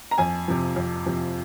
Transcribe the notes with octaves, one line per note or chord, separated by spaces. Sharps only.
A#5
F2 G#5
C3 F3
F2
C3 F3